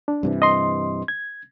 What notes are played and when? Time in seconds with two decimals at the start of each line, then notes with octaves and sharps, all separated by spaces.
0.08 D4
0.23 G2 C3 E3
0.42 D#5 C6
1.08 G#6